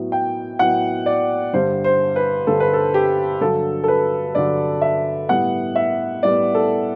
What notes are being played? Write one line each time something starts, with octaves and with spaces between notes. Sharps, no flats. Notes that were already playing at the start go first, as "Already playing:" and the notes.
Already playing: A2 F#3 B3
G5
A2 F#3 B3 F#5
D5
G2 D3 G3 C5
C5
B4
G2 D3 G3 A4
B4
A4
G4
G2 D3 F#3 A4
A4
B4
G2 D3 F#3 D5
E5
A2 G3 B3 F#5
E5
A2 G3 B3 D5
A4